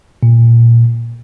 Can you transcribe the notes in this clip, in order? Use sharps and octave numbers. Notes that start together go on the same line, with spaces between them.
A#2